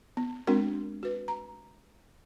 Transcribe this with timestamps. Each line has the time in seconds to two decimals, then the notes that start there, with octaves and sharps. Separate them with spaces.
0.17 B3
0.47 G#3 C4 D4 F#4 A#4
1.03 F#4 B4
1.28 A#5